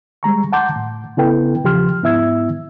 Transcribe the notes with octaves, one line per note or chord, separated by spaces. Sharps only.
G3 G#3 A#5 C#6
F#5 A5 C6 D6 G6
A2
C#3 B3 E4 A4 B4 G5
E2 C#3 F3 G4 C6 F6
G#2 B3 E4 E5 E6 G#6